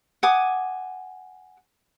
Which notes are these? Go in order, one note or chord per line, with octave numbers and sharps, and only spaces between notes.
F#5 G#5 D6 D#6